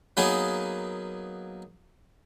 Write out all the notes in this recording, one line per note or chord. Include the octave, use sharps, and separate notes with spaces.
F#3 A#3 B3 D#4 G#4